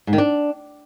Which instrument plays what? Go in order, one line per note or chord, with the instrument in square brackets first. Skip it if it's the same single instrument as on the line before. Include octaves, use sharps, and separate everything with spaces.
[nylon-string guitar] G#2
D#3
D4